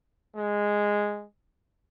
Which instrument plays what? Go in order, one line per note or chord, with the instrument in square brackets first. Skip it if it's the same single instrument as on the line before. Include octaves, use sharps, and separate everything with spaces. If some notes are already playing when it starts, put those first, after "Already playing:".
[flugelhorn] G#3